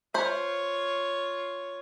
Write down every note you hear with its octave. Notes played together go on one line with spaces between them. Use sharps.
F4 C5 C#5 B5